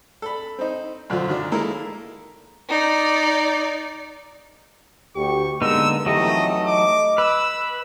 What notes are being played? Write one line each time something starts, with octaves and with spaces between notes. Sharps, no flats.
A4 B5
C4 D#4
F#2 D3 F3 F4
D#3 F#3 D4
G#3 A#3 E4 A4 A#4
D#4 D5
D2 G4 C#6
D3 G#3 A#3 B3 D#4 E6
F2 E3 F#3 A3 D#4 G4 D#5
D#5 D6
B4 E6